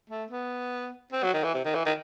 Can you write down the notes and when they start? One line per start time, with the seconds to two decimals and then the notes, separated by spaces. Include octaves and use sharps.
0.10 A3
0.31 B3
1.13 C4
1.23 F#3
1.34 D#3
1.44 E3
1.54 C3
1.65 D#3
1.75 E3
1.85 D#3